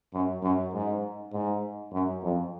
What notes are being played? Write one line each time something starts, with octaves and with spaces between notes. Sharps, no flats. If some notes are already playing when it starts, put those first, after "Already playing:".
F#2
F#2
G#2
G#2
F#2
F2